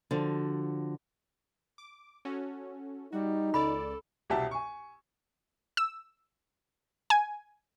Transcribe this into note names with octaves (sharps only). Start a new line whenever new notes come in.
D3 F3 F#4
D6
C#4 F#4 A4
G3 D#4 F#4
C#2 A4 D5 B5
E1 C2 F#4 G4 E5 A5
G#5 C#6
E6
G#5